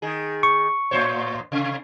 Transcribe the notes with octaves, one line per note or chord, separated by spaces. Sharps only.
D#3 G#4
C#6
A2 C5 C#5
C3